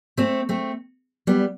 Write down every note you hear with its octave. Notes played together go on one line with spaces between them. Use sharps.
A3 C4
A3 C4
G3 B3